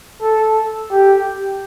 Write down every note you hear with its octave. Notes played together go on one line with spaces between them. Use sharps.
A4
G4